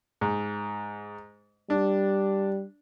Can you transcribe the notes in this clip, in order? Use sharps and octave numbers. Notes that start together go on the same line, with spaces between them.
G#2
G3 D4